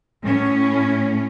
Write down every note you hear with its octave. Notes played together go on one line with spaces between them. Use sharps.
A2 C#4